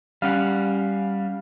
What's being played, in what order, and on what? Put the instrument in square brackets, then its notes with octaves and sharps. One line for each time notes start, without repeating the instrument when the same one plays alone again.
[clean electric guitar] G3 C#4 F#5 [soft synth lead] F5